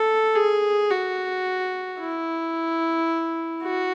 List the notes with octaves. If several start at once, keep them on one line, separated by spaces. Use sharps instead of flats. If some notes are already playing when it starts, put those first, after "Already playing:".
Already playing: A4
G#4
F#4
E4
F#4